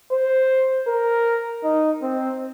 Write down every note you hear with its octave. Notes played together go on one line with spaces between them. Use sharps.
C5
A#4
D#4
C4